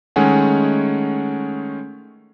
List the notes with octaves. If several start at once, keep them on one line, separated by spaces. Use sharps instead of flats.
D#3 G#3 A3 C#4 F#5 G#5